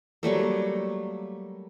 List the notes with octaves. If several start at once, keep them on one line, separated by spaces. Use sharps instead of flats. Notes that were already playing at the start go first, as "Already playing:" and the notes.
F#3 G3 A3 A#3